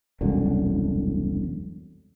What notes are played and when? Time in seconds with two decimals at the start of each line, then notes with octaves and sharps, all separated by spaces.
0.21 E1 C2 F#2 D3